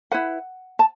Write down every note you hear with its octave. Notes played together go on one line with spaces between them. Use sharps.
E4 B4 F#5
A5